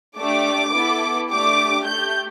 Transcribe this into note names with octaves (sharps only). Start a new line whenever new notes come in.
A3 D4 G4 D6
B3 E4 A4
A3 D4 G4 D6
A3 G4 G6